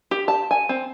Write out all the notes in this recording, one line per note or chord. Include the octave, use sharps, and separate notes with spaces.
G4
A5
G#5
C4